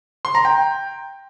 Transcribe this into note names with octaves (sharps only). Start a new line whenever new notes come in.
C6
A#5
G5